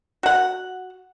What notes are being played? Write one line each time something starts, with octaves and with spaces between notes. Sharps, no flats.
F#4 F#5